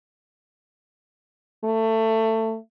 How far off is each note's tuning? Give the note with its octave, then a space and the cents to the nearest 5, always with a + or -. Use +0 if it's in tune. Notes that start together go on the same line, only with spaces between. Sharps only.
A3 +20